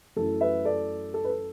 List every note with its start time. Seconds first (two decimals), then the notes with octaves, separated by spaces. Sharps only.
0.16 F#2 E3 A3 A4
0.41 B4 E5
0.65 A4 D5
1.14 A4
1.24 B4
1.29 A4